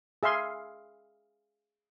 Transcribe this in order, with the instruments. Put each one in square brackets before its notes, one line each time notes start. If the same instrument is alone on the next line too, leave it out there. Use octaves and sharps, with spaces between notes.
[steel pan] G#4 E5 F5 C6